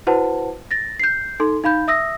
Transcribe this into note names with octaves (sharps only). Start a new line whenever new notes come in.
E4 F#4 B4 C5 F#5 A5
A6 A#6
G6 C7
D#4 A4 C6
D#4 F5 B5 G6
E5 D#6 E6 A#6